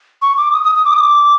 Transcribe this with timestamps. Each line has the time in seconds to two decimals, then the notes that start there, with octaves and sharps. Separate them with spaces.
0.22 C#6
0.37 D6
0.53 D#6
0.64 D#6
0.75 D#6
0.85 D6
0.93 D#6
1.00 D6